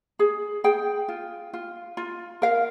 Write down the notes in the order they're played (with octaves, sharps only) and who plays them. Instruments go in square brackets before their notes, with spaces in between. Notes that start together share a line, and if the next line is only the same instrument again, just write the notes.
[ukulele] G#4
G#4 G5
F4
F4
F4
A#4 F5